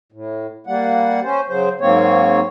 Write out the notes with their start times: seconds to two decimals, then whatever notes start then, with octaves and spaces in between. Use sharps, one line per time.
0.12 A2
0.67 G3 A#3 F#5
1.24 C#4 C5
1.49 C#3 F#3 C5
1.81 G#2 F#3 A#3 C4 C#5